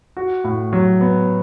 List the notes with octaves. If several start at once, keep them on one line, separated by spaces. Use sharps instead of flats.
F#4
A2
F#3
B3